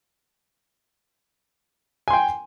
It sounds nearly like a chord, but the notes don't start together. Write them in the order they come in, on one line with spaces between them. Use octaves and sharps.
G#5 C6 G5